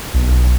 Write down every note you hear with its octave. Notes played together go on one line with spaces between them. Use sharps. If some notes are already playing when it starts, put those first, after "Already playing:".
B1